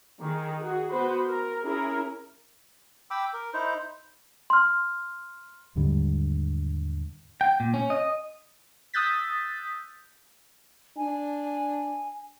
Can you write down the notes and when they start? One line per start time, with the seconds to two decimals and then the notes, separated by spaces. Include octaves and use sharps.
0.21 D#3 G#4
0.60 F#4 G#4
0.91 B3 F#4 B4 C5
1.27 A#4
1.64 C#4 E4 G#4 A#4
3.11 G5 B5 D6 E6
3.33 A#4
3.54 D#4 E4 C5
4.50 C6 F6
5.76 D#2 G#2 D3 G3
7.41 G5
7.60 A#2
7.74 C#4
7.90 D#5
8.94 D#6 E6 F#6 G6 A6 B6
10.97 D4 G#5